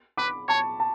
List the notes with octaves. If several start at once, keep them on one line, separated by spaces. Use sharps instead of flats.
B4 B5 D6
C#5 A5 C#6
A5